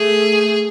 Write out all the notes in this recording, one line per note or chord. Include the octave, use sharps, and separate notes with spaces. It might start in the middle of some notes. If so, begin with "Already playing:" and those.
Already playing: A3 G#4